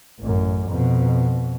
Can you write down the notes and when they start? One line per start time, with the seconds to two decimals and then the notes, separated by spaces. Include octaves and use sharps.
0.20 A1 F#2
0.69 F2 B2